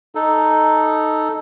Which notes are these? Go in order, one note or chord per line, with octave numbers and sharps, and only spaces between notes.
D#4 A4